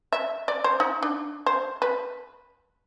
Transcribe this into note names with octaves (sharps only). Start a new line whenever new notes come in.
E5
D5
C5
D#4
D4
C5
B4